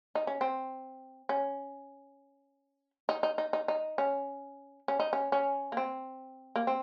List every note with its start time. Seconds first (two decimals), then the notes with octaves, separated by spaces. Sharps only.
0.15 D#4
0.27 C#4
0.41 C4
1.29 C#4
3.09 D#4
3.23 D#4
3.38 D#4
3.53 D#4
3.68 D#4
3.98 C#4
4.88 C#4
5.00 D#4
5.13 C#4
5.32 C#4
5.72 A#3
5.77 C4
6.56 A#3
6.67 C4